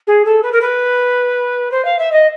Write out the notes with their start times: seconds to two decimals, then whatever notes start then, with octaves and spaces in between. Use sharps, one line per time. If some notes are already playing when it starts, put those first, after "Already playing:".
0.07 G#4
0.25 A4
0.43 B4
0.52 A#4
0.61 B4
1.71 C5
1.85 F5
1.99 E5
2.12 D#5